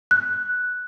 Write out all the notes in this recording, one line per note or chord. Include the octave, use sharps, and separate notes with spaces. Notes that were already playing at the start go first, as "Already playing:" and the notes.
F#6